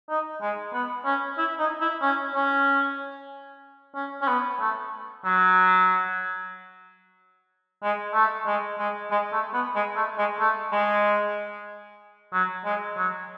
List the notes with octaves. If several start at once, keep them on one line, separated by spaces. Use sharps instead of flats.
D#4
G#3
B3
C#4
E4
D#4
E4
C#4
C#4
C#4
C#4
B3
A3
F#3
G#3
A3
G#3
G#3
G#3
A3
B3
G#3
A3
G#3
A3
G#3
F#3
G#3
F#3